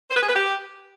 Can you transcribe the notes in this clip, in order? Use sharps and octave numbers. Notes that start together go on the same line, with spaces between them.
C5
B4
G#4
B4
G4